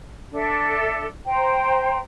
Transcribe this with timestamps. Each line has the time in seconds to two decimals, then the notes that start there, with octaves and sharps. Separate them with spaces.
0.31 D4 A4 E5
1.25 C5 G5 A#5